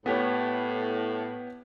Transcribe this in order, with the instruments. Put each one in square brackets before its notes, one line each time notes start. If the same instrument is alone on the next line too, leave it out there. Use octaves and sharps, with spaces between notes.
[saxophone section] A2 [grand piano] B3 G4 C#5